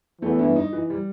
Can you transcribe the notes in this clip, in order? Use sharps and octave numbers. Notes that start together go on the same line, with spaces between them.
E2 E3 A3
G2
D#4
E3
G3